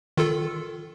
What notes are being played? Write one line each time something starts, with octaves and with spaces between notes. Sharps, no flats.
D#3 F4 A4